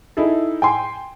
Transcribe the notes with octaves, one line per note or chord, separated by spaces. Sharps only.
D#4 E4 G#4 A4
G5 G#5 C6